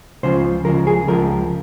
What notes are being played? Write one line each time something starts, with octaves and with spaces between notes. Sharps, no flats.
C#2 C#3 F3 C5
C#2 C#3 F3 A#4
G#4
C#2 C#3 F3 A#4